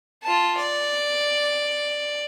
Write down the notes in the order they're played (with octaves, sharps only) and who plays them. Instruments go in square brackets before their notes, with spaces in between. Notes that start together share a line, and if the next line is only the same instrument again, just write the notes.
[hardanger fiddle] F4 A5
D5